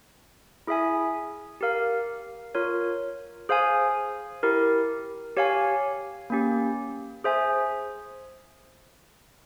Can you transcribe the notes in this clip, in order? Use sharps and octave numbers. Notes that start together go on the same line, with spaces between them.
E4 G#4 E5 G#5
G4 A#4 F5
F4 A#4 C#5
G#4 C5 F5 G#5
E4 G4 A#4
G4 C#5 F5 G#5
A#3 C#4 G4
G#4 C5 E5 G#5